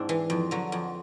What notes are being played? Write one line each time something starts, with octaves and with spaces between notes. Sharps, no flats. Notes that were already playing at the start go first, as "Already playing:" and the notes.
Already playing: G#2 C4 D4 E4
E3
F2
D3 F#3
F2